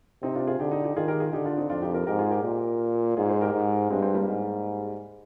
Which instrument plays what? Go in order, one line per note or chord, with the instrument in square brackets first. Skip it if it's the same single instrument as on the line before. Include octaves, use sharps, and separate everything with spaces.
[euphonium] C3 [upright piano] C4 D#4
[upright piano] D4 F4
F4 G#4
[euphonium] D3 [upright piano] D#4 G4
[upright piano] D#4 G4
D#4 G4
[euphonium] D#3 [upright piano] F4 G#4
[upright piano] G4 A#4
F4 G#4
[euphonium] D3 [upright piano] D#4 G4
[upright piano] D4 F4
C4 D#4
[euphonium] F2 [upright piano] D4 F4
[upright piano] D#4 G4
G4 A#4
[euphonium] G#2 [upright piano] G4 A#4
[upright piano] F4 G#4
G4 A#4
[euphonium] A#2
[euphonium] G#2 [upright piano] F4 G#4
[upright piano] G#4 C5
G4 A#4
[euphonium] G#2
[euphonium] G2 [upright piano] G#3 C4
[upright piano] G#3 C4
G3 A#3
[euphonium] G#2